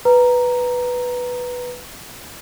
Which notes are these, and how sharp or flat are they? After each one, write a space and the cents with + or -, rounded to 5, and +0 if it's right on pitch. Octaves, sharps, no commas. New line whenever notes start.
B4 +0 A#5 +0